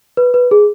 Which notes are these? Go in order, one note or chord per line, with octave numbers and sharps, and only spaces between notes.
B4
B4
G#4